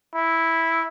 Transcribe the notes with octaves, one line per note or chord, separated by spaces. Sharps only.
E4